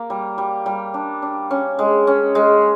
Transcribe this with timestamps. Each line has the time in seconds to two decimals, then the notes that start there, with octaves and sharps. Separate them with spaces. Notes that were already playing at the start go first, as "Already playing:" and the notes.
Already playing: A#3
0.10 G3
0.38 G3
0.66 G3
0.94 D4
1.22 D4
1.51 C#4
1.79 G#3
2.07 C#4
2.35 G#3